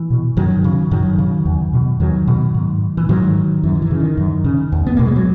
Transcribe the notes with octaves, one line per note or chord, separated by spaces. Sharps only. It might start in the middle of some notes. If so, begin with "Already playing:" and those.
Already playing: E3
B2
F#2 D#3 F#3
C#3
F#2 D#3 F#3
C#3
E2
B2
E2 D#3 F#3
B2
G#2
E3
G#2 D#3 F#3
F#2 E3
D#3
E3
C#3
D#3
F#2
C#3
E2
B3
B2 A#3
G#3
F#3